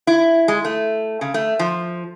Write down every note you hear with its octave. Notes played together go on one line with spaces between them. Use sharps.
E4
G#3
A3
C#3
A3
F3